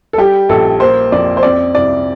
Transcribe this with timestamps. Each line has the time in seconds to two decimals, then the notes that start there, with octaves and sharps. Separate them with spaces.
0.13 A4
0.18 G3 G4
0.49 A#1 A4
0.80 A#3 C5
1.12 F2 D5
1.37 C5
1.43 C4 D5
1.75 C2 D5